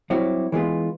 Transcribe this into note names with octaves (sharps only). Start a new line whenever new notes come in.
F#3 G3 C4 E4 F#4 G4
E3 G#3 B3 F4